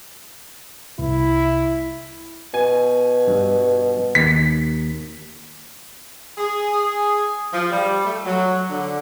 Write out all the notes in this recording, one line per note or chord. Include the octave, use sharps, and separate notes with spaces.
C2 E4
B2 G#5
G2
D#2 B6
G#4
F3
G3
A3
F#3
D3